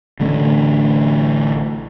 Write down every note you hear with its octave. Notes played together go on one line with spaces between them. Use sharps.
A1 D3 A3 C#4